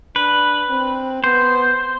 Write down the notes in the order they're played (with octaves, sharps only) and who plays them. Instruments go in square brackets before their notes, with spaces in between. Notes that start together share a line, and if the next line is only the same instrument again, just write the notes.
[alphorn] D4 [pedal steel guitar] B4
[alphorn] C4
[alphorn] B3 [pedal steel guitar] C5